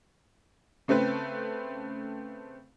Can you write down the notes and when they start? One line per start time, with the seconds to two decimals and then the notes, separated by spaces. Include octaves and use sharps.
0.88 C#3 A3 C4 B4